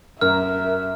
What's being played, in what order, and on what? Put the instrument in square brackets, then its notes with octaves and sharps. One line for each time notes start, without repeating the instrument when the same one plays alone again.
[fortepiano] F#2 [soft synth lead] A#4 [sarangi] E5 [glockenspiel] F6